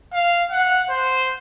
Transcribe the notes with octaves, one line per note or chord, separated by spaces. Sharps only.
F5
F#5
C5